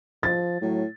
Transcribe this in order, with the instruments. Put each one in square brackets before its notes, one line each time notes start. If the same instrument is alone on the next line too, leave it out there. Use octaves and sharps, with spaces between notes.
[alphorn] F3 [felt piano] A6
[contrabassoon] A2 [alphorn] F#3